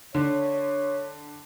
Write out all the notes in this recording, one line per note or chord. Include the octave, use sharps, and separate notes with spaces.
D3 C#5